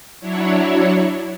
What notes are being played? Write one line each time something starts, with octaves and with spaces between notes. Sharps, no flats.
F#3 D4 E4 C#5